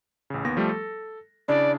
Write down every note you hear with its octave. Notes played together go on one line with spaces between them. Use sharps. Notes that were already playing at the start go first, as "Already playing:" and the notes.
A1 C#3
D#2 B3 A#6
F3 G3 A3
A4
C#3 D4 E4 D5